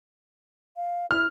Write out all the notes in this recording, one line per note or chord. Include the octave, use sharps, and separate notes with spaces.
F5
E4 F6